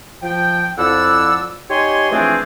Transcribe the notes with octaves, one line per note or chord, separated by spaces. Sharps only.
F3 G5
F2 F3 E4 D5 F#5 E6
D#4 G4 C#5 G#5 C6
E3 F3 A3 C4 D4 G#4